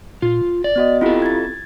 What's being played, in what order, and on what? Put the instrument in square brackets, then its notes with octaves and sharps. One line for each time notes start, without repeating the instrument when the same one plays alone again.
[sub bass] A#2 [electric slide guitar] F4
[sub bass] D#1
[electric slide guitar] D5
[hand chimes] B3 F#4 D#5
[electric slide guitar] C4 A4 [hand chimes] E4 F4 G4
[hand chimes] G#6 A6